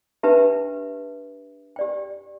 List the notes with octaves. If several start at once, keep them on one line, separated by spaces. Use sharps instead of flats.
D4 G4 B4 E5 A5
G4 D5 G5